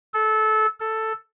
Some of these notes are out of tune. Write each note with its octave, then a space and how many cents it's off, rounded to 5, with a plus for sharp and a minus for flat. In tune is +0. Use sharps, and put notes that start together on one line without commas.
A4 -20
A4 +5